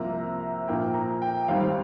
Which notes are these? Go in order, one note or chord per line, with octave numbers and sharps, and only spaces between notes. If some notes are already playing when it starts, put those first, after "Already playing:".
Already playing: C2 C3 F3 A#3 A#5
A#2 F3 A#3 G5
A#5
G5
D#2 D#3 G3 C4 F5